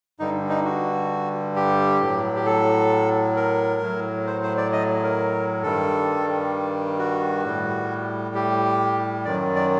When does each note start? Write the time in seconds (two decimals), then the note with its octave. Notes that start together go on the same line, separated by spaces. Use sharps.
0.19 G2 D3 G3 D#4
0.49 D#4
0.65 F#4
1.56 G4
2.01 A2 F#3
2.36 G4
2.46 A4
3.37 A#4
3.81 A2 F#3
4.27 C5
4.43 C5
4.57 D5
4.73 D#5
5.03 A#4
5.63 G2 D#3 G3 A4
6.99 F#4
7.45 A2 G3
8.35 G4
9.25 F#2 D#3 F#3 D5
9.56 D5